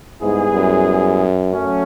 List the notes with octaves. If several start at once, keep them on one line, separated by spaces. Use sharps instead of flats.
G#2 G3 B3 E4 G#4
F#2
F#3 A3 C#4